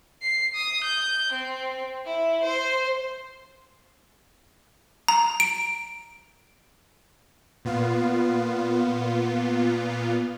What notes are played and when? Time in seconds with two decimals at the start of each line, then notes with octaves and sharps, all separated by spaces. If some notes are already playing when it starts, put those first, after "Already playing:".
0.22 C7
0.55 D#6
0.84 G6
1.32 C4
2.06 E4
2.43 C5
5.08 A#5
5.40 D7
7.65 A#2 B3 F4